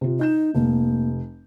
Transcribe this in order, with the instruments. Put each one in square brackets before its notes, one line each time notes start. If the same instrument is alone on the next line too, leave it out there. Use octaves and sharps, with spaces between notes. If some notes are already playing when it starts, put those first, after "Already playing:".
[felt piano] C3 F4
[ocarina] D#4 [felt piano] D#5 G6 E7
[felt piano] F1 [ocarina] A#3